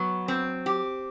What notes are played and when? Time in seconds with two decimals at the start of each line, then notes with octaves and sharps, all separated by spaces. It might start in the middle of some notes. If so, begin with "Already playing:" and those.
Already playing: F#3 B3
0.28 C4
0.66 G4